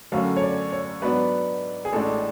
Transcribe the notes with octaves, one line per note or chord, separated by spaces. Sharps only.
F#2 D3 F#3 A3 C#4 F5
C#5
D5
C#5
G#2 F#3 B3 D4 B4
G#4
A1 A2 G#3 D4 A4